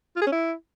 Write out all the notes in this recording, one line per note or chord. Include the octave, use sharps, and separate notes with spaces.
F4
G#4
C#4
E4